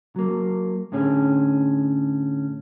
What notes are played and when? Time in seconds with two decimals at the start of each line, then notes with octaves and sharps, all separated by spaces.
0.16 F#3 A#3
0.92 A2 D3 C#4 G#4